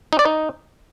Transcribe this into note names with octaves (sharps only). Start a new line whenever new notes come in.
D#4
D5
D#4